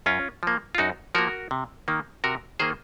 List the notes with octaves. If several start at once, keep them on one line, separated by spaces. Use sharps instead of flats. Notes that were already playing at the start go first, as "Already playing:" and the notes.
F#2 C#4 F4
F3 A#3
F4
F#2 D#4 F#4
F3 A#3 F#4 A#4
C3
D#3 A#3
C3 F#4 A#4
D#3 A#3 G#4 C5